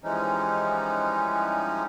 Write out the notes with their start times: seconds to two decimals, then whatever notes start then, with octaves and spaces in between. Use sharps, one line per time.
0.04 E3 F3 G3 G#3 C#4 D#4